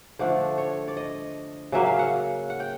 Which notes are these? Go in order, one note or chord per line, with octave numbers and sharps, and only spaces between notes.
D3 F3 A3 D4 D5
C#5
D5
D#5
C#3 F#3 A#3 E5
F5
F#5
F#5
G5